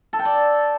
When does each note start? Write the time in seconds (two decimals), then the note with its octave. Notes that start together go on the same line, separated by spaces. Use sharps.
0.13 A4
0.19 G5
0.25 D5